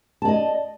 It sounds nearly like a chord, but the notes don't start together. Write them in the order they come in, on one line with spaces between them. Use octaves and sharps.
A5 D5 D#5